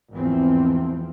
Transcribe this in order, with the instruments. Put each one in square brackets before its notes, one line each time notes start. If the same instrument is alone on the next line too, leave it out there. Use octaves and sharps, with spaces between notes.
[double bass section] G#1 E2 E3 F3 C4